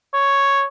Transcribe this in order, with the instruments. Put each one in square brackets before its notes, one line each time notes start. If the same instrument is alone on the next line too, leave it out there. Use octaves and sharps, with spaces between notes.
[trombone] C#5